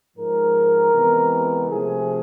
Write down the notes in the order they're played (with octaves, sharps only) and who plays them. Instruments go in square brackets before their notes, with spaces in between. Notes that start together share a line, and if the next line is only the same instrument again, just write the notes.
[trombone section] G#2 F3 G#3 A#4
C3 E3 G#3 B3
C3 F3 A3 G#4